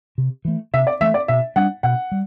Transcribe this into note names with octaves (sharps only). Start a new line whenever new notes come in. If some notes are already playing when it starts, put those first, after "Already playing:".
C3
E3 A3
C3 E5
D5
E3 A3 E5
D5
B2 E5
G3 D4 F#5
B2 F#5
G3